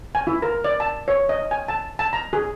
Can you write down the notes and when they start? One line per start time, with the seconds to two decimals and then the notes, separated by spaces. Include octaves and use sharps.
0.15 G#5
0.27 E4
0.42 A#4
0.64 D5
0.80 A5
1.08 C#5
1.29 D#5
1.51 G#5
1.68 A5
1.99 A5
2.13 A#5
2.33 G#4